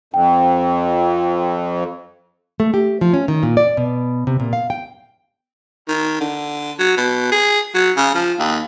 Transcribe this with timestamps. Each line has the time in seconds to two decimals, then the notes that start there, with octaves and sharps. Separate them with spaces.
0.14 F2 G5
2.60 A3
2.74 G4
3.01 F3
3.13 C#4
3.28 D#3
3.43 A#2
3.57 D5
3.77 B2
4.27 C3
4.40 A#2
4.53 F5
4.70 G5
5.88 D#3
6.20 D3
6.78 F#3
6.97 B2
7.31 G#4
7.74 F#3
7.96 C#3
8.14 F3
8.38 D#2